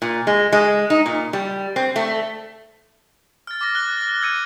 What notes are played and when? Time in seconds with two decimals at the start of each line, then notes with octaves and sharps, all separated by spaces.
0.02 A#2
0.27 G#3
0.52 G#3
0.90 D#4
1.06 A#2
1.33 G3
1.76 C4
1.96 A3
3.47 F6 A6
3.61 D6 A#6
3.75 F#6 G7
4.01 F6
4.22 E6 G#6 C#7 D#7